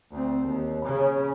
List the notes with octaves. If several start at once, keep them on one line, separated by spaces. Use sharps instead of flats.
D2 C4
D#2
C#3 C#4